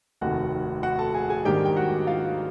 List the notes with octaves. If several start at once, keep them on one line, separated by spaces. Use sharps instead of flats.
F1 D#2 D#3 F#4 F#5
F#4 F#5
A4 A5
G#4 G#5
G#4 G#5
G#2 D#3 G3 A#3 D4 G4 G5
G5
F#4 F#5
F4 F5